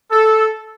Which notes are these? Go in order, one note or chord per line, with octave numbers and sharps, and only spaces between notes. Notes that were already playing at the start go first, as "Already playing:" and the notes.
A4